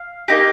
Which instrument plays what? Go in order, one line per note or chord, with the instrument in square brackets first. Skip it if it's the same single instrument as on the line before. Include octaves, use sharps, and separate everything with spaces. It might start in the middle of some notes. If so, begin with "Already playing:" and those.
Already playing: [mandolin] F5
A#3 D#4 G4